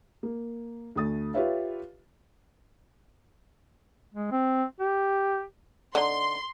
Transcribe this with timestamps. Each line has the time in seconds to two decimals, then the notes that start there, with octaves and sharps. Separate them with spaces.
0.23 A#3
0.96 D2 A3 D#6 A6
1.34 F4 G4 B4 C#5 E5 F5
4.14 G#3
4.31 C4
4.80 G4
5.95 D3 D#4 C6